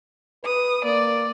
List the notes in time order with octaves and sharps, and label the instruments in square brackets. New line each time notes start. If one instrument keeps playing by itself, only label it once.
[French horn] B4 [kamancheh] D#6
[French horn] A#3 [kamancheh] D5